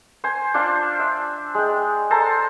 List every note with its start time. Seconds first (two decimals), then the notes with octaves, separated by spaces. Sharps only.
0.24 C5 G#5
0.54 D4 F4 C5 F5
0.99 E5
1.55 G#3 G5
2.10 A4 C5 A5 A#5